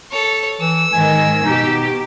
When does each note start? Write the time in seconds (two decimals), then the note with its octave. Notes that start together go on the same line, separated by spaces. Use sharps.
0.11 A4 C#5
0.61 E3 E6
0.93 G#2 D#3 G#5
1.44 B2 D#4 G4